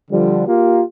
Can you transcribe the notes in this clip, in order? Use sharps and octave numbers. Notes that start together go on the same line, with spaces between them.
D3 F3 G3
A#3 F4 G4